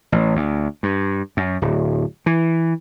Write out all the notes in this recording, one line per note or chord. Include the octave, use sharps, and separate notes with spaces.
A1
D2
G2
F#2
D1
E3